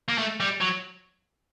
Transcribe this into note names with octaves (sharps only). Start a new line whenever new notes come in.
A#3
A3
G3
F#3